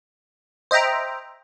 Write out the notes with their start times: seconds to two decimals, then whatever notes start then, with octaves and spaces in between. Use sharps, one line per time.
0.71 C5 D#5 E5 G5 A#5